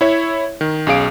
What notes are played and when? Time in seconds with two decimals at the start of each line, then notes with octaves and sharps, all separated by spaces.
0.01 E4 C#5 E5
0.61 D#3
0.87 B1 C#4 G#4 F5 D7